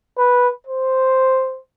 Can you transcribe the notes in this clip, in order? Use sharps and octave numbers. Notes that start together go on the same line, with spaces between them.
B4
C5